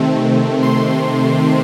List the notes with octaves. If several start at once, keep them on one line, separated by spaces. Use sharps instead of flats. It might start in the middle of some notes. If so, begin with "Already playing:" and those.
Already playing: C3 D#3 A3 C4
C6